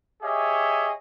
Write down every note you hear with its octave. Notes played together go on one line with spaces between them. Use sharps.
G4 G#4 C#5 D#5 E5